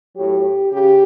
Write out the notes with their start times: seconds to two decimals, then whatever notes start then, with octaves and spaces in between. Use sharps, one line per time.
0.16 A2 F#3 G4
0.72 C#3 G4